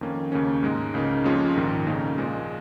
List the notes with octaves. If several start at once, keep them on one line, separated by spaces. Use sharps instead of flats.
F2 D#3 A#3 C#4
D#2 C#3 A#3 C#4
G#2 G#3 D#4
C#2 C#3 A#3 D#4
F2 F3 G#3 C#4 F4
A#1 G#2 D#3
F2 C#3 A#3 D#4
A#1 A#2 G#3